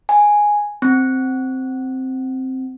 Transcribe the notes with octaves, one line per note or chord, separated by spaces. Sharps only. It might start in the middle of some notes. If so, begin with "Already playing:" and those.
G#5
C4